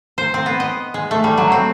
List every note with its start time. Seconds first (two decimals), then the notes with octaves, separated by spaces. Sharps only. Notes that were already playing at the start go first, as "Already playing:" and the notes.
0.18 C5
0.34 C4
0.46 B3
0.60 D#5
0.94 G#3
1.11 A3
1.24 G3
1.38 F#3
1.52 C4